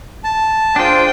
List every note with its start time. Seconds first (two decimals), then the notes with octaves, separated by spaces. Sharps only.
0.24 A5
0.76 D4 F4 G#4 C5 G5